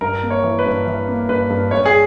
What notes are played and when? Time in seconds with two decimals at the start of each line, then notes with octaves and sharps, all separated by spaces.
0.01 G2 A#4
0.23 A#3
0.30 C#5
0.44 E3
0.59 B4
0.66 G2
0.87 E3
1.08 A#3
1.29 G2 B4
1.50 G2
1.71 G2 C#5
1.85 G#4